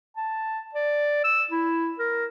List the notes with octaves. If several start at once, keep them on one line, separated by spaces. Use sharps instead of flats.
A5
D5
E6
E4
A#4